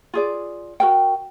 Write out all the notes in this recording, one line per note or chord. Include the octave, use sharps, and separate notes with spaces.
F4 G#4 D5
F#4 A#4 G5